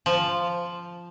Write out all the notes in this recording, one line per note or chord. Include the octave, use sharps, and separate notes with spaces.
F3